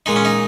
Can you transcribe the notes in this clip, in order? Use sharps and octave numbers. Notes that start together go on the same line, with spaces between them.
A#2 G#3 D#4
C#4
D#4